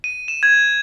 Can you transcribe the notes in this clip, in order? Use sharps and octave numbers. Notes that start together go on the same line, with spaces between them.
D#7
E7
G#6